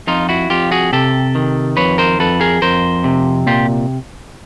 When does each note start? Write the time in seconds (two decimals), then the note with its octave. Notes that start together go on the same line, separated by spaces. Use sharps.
0.07 F2 D#4 F4
0.29 E4 F#4
0.50 F2 F4 G4
0.72 F#4 G#4
0.93 C3 G4 A4
1.35 D#3
1.77 F2 B4 C#5
1.98 A#4 C5
2.19 F2 A4 B4
2.41 G#4 A#4
2.62 F2 A#4 C5
3.04 C3
3.47 A#2 F4 G4